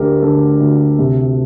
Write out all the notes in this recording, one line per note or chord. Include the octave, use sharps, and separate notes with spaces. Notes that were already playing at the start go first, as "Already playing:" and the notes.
Already playing: D2 D3 G4 A#4 D5
D3 A4
D2
C3